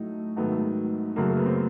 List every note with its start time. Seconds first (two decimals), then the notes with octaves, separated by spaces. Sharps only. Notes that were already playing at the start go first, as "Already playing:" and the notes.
Already playing: A2 F#3 A3 D#4
0.36 G#2 D#3 F#3 A3 B3
1.16 F#2 C#3 F#3 A3 A#3
1.26 A#3
1.36 B3
1.46 C4